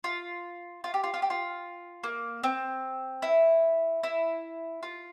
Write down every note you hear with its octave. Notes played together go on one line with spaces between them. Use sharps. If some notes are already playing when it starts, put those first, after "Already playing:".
F4
F4
G4
F4
F4
G4
F4
A#3
C4
E4
E4
F4